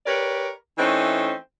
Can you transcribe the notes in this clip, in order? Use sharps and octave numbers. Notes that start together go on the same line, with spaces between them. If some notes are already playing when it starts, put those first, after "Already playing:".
G4 A#4 B4 C#5 D5
E3 A3 C4 C#4 D#4